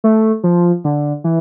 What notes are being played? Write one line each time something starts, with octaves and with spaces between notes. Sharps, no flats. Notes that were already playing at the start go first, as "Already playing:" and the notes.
A3
F3
D3
E3